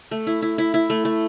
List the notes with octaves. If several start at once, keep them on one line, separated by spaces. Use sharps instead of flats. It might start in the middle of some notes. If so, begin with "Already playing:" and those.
A3
E4
E4
E4
E4
A3
A3